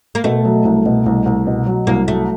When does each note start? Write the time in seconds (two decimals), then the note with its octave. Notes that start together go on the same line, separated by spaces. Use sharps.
0.15 A#3
0.24 B2 A3
0.45 F#3
0.65 C2
0.86 B2
1.06 C2
1.26 C2
1.47 B2
1.67 F#3
1.87 C2 A#3
2.08 F#3 A3